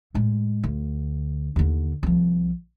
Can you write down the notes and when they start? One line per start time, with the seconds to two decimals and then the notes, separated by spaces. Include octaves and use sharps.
0.14 A2 G#3
0.64 D2
1.56 D#2 D3
2.03 C2 F3